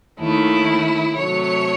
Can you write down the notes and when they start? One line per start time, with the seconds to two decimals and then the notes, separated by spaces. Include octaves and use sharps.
0.20 D#2 D#3 A3 E4
1.16 C3 F#3 A3 C#5